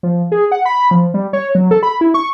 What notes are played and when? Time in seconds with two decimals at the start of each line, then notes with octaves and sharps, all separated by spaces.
0.03 F3
0.32 G#4
0.52 F#5
0.66 B5
0.91 F3
1.14 G3
1.33 C#5
1.55 F#3
1.71 A4
1.83 B5
2.01 E4
2.14 C#6